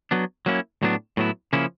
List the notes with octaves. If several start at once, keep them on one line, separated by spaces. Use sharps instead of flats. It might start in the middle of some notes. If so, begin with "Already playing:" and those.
F#3 B3 D4
F#3 A#3 C#4 E4
A2 F#3 B3 D4
A2 F#3 B3 E4
C#3 F3 A#3 C#4 E4